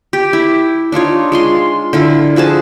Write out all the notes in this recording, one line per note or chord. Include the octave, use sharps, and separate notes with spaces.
G4
E4
D4 D#4 F4 C#5
G#3 F4 C6
D3 E4 F4
F3 F#4 G#4 A5